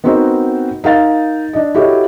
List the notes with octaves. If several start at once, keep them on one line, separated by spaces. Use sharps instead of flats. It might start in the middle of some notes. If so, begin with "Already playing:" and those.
B3 C4 D#4 F#4 A#4 C5
D#4 A#4 F5 A6
D4 D#5
E4 F#4 G4 A4 C#5 D#5